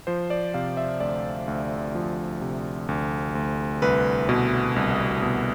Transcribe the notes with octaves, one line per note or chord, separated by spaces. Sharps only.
F3 C5
D5
C3 F5
E5
D2 D5
D2
F3
C3
D2
D2
C2 B4
B2
C2
B2